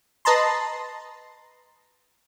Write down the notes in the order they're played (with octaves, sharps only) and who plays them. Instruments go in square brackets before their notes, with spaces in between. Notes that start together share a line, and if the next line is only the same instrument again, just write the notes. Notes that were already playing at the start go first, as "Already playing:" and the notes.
[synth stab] B4 D#5 A5 A#5 C6